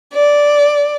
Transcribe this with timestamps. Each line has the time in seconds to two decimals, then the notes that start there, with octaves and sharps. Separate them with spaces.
0.14 D5